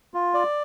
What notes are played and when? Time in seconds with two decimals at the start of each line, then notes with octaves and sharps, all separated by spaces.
0.14 F4
0.34 D5